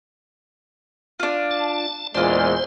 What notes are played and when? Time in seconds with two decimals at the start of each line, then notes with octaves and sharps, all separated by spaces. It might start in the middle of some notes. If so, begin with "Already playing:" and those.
1.20 D4 F4
1.51 A5
2.14 E2 A#2 G#3 D4 F4 C5